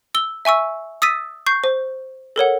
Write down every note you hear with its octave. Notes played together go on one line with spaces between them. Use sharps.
E6 G7
E5 G#5 C#6 E6
D#6 E6 A6 B6 D#7
C#6 G6 C7
C5
A4 A#4 C#5 F#5